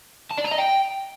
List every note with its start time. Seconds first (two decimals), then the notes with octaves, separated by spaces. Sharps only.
0.31 A5
0.38 D5
0.44 A#5
0.51 D#5
0.58 G5